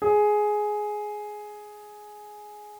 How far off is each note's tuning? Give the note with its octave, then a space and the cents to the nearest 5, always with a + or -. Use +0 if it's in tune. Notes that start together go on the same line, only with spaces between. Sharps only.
G#4 +10